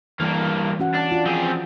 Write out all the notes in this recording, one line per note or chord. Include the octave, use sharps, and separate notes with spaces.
G2 E3 A#3
C#4 F#4 F#5
D4
F4
F3 C4 G#4